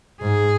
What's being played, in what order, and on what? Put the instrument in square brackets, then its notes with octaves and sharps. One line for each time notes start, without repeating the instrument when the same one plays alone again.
[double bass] G#2 [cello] G#4